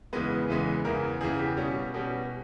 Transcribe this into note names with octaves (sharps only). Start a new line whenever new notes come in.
E2 C#3 E3 G#3 B3 B4
E2 C#3 E3 G#3 B3 B4
E2 C#3 E3 A#4
E2 C#3 E3 G#4
G4
B2 G3 C#4
B2 G3 C#4